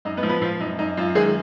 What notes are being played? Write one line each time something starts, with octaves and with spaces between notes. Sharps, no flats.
F#2 D#4 D#5
B3 B4
F3
B3 B4
F3 F4
F#2 D#4
F#2 D#4
F#2 F4
D#3 G#3 G#4